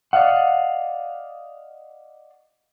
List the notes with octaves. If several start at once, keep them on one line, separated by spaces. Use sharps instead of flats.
D5 D#5 F5 F#5